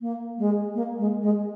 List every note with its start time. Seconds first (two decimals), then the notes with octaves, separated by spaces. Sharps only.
0.01 A#3
0.39 G#3
0.75 A#3
0.98 G#3
1.22 G#3